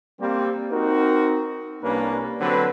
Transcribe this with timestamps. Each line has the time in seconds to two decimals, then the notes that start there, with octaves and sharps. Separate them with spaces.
0.20 G3 A#3 C4
0.70 C4 D#4 F#4 A#4
1.82 C2 G3 A#3 C#4 D4 B4
2.40 D3 F#3 C4 B4